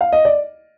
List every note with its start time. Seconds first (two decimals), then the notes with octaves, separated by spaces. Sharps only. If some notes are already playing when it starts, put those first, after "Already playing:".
0.01 F5
0.12 D#5
0.25 D5